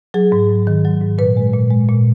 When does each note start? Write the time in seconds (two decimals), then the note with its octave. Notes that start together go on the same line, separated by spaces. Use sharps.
0.14 F#3 G#4
0.32 G#2
0.49 G#2
0.67 D#3
0.85 F#3
1.01 G#2
1.18 A#2 B4
1.37 G#3
1.53 A#2
1.70 G#3
1.89 A#2